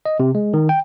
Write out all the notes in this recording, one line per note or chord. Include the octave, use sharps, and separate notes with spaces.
D#5
C3
G#3
D#3
G5